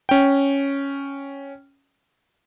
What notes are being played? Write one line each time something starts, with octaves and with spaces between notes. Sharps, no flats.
C#4 G5